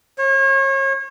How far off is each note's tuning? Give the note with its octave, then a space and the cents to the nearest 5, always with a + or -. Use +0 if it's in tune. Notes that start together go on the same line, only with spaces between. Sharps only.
C#5 -35